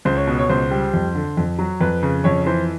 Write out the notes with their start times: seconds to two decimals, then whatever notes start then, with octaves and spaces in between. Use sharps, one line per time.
0.05 C#2 C5
0.17 C#5
0.27 B2
0.39 C#5
0.49 C#2 C5
0.71 G3
0.94 F2
1.15 D3
1.37 F2
1.59 F#3
1.81 F2 B4
2.02 C#3
2.24 F2 C#5
2.46 E3 C5